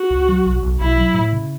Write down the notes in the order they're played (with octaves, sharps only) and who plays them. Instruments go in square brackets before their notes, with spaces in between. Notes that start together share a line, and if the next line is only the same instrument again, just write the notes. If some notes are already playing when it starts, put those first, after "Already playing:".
Already playing: [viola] F#4
[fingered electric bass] C#2
F#3
B1
B1
[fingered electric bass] B1 [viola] E4
[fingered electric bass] F#3
A2
C#3